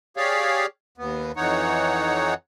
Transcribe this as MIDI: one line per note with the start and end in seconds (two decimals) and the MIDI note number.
0.17 0.66 67
0.17 0.66 68
0.17 0.66 73
0.17 0.66 74
0.17 0.66 77
0.98 1.32 39
0.98 1.32 59
1.36 2.34 41
1.36 2.34 52
1.36 2.34 63
1.36 2.34 73
1.36 2.34 78